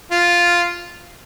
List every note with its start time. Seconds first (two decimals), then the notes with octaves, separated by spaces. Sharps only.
0.11 F4